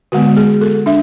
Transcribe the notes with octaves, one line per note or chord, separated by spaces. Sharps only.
D3 G#3 B3 F#4
G#4
A4
D4 E5